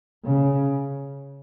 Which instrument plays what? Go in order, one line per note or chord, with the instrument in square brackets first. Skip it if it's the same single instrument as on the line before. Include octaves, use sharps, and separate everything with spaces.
[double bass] C#3